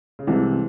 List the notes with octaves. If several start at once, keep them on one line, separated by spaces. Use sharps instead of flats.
C#3
C2 C3 E3 G#3 C4